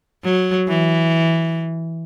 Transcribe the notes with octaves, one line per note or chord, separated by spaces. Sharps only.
F#3
E3